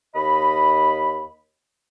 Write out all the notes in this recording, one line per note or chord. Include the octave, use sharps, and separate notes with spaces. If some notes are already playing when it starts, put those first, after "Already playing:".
D#2 D#5 B5